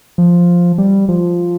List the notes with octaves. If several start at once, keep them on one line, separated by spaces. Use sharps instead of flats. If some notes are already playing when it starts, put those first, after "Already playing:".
F3
G3
F3